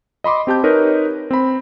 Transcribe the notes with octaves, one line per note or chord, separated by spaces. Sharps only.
D#5 B5 C6 D6
C4 G4 A5 G6
D#4 A#4 B4 C#5 D#5
C4 B5